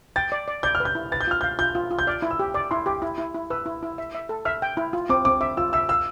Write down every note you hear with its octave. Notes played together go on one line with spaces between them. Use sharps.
G5 A6
D5
D5
D5 G6
F6
B4
G6
E4
B4 A6
G6
F4 F6
G6
F5
F4 G6
F4
F4
G6
D5 F6
E4
E6
G4
D5 D6
E4 C6
G4 D6
E4
E4
E4
B4 E6
E4
E4
E5
E5
A4
E5 F6
G5
E4
F4
C4 D6
C4 D6
E5 D6
F4 E6
E5 E6
F5 E6